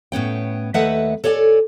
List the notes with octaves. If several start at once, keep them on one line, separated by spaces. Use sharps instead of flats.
A2 B3 C#4 G5
D#2 A3 B4 D#5 E5 F#5
A4 C#5 D5 F5 G#5